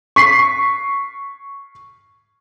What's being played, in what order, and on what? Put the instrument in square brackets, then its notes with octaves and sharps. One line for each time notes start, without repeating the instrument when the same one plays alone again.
[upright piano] C#6 B6 C7